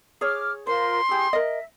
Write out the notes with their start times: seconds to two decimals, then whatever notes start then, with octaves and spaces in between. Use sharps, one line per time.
0.21 G#4 C#5 D6 F6
0.67 F4 A#4 C5 C6
1.09 E4 G4 G#4 D#6
1.33 A#4 D#5 E5